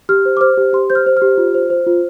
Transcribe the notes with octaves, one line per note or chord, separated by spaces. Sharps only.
G4 F6
C5
D6
C5 F6
G4
G4 C6
C5 G6
F6
C5
F6
G4
F4
C5
C5
F4